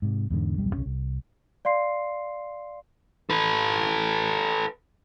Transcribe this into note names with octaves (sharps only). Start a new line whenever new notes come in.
G#2 C3
E2 G#2 D3
D1 B1 F2 G3
C2 F#2 C#4
C2
D5 F5 C6 C7
A4 B4